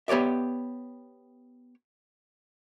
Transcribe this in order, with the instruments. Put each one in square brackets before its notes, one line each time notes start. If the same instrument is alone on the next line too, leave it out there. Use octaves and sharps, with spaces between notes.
[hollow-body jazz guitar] B3 G4 C#5 D5 E5